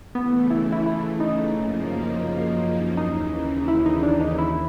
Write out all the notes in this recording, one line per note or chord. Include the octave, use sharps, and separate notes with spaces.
C#3 E3 A3 B3
E4
E4
E4
D#4
F#2 C#3 F3 A#3
D#2 C#3 E3 D#4
E4
D#4
D4
D#4
D#2 E4